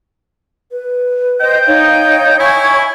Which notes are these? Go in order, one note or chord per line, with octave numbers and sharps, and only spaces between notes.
B4
C5 D#5 G5
D#4 C#5 F5
E4 C#5 G#5 C#6 G#6